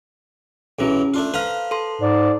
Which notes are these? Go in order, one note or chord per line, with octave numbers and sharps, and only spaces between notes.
B1 E3 F#3 C#4 G#4
A3 D4 F4
A4 B4 C5 F5 A#5 F6
A4 C6
G#2 D5